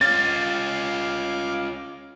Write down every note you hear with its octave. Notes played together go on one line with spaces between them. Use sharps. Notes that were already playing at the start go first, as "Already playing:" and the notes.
C#4 F4 F5 D6 A6